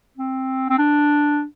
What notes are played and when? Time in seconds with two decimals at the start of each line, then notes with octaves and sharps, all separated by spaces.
0.17 C4
0.70 C4
0.79 D4